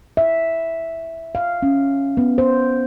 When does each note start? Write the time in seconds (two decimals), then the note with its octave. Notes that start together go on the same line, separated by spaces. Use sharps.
0.17 E5
1.35 F5
1.63 C#4
2.17 B3
2.38 C5